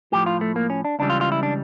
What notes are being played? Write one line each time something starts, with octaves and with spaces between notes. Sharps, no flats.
A2 F3 G4
F4
A3
A#3
C#4
D4
C#2 C#3 E3 G3 D4
F4
F4
E4
D4